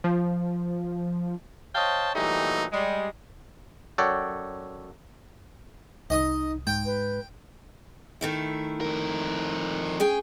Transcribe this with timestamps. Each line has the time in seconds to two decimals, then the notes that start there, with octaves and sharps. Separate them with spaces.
0.04 F3
1.75 C5 C#5 D#5 F5 G5 A5
2.15 A#2 E3 F#3 G3 A3 D#4
2.72 G3 G#3
3.98 F#2 A4 C#5 D5 F#5 G5
6.10 C2 D#4 D#5 D#6
6.67 G#2 G5
6.86 B4
8.21 D#3 A3 E4
8.81 F2 A#4
10.00 C#4 G#4 G5